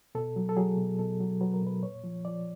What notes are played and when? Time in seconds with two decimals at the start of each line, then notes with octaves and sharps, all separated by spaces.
0.15 B2 A4
0.36 F#3
0.49 A4
0.57 F#3 G#4
0.78 B2
0.99 B2 A4
1.20 F#3
1.41 F#3 B4
1.54 A#4
1.62 B2 B4
1.83 A#2 C#5
2.04 F3
2.25 F3 D5